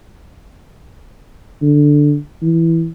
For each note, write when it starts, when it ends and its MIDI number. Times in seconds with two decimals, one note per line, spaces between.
1.62 2.17 50
2.42 2.89 52